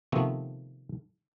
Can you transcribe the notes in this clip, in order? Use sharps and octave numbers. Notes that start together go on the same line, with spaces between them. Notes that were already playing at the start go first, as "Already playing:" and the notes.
C3 D#3 F3 A3 B3 C4